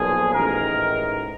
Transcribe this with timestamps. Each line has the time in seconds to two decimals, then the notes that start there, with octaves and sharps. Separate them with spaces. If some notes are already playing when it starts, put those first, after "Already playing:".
Already playing: B1 A#2 F3 G#4
0.34 A1 G#2 D#3 A#4